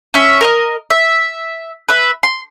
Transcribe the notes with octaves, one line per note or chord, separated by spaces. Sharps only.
C#4 E5
A#4 C5 D#5
E5
B4 E5
C6